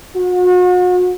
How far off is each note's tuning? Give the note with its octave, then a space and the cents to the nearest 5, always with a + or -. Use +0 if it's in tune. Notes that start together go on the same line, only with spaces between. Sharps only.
F#4 -40